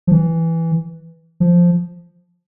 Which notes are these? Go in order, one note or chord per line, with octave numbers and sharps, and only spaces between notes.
F3
E3
F3